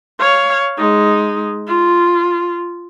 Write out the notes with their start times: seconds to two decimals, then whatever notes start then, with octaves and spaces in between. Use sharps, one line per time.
0.19 C#5 F5
0.78 G#3 D#4
1.67 F4